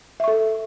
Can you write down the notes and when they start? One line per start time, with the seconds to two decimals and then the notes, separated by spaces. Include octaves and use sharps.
0.20 E5
0.24 C#6
0.28 A4